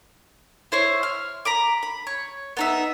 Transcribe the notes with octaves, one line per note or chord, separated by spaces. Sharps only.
E4 C5 C#5
F6
A#5 B5 D6
B5
C#5
B3 D#4 E5